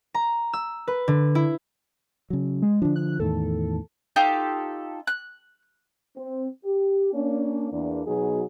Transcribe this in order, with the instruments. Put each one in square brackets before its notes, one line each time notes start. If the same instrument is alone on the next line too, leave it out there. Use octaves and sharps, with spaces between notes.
[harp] A#5
E6
B4
D3
E4
[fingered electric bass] C#3 F#3
[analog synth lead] G#3
[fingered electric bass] D3 F3 [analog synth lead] D4
[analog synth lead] F#6
[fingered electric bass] E2 A2 D#3 [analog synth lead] A4
[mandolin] D#4 F4 G4 A4
F#6
[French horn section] C4
G4
A#3 C#4 D4
E2 A#3 D4
B2 F#3 B3 D#4 F#4 G#4